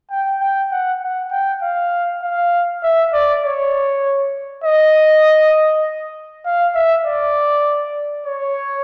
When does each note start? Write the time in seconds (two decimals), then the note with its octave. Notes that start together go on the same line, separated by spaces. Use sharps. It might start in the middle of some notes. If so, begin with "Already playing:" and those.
0.11 G5
0.41 G5
0.72 F#5
1.02 F#5
1.32 G5
1.62 F5
2.23 F5
2.83 E5
3.13 D5
3.44 C#5
4.64 D#5
6.46 F5
6.75 E5
7.05 D5
8.27 C#5